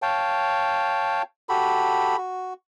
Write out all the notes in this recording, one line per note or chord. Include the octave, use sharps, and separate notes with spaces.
C#5 F5 G5 A5
F#4 G4 A4 B5
F#4